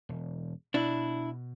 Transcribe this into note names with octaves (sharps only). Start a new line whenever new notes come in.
E1
B2 D4 E4